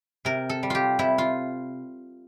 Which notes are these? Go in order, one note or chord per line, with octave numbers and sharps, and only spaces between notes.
C3 A#4
A4
G3
F4 G4
C3 E4
F4